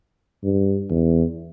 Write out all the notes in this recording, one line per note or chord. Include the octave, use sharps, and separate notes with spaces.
G2
E2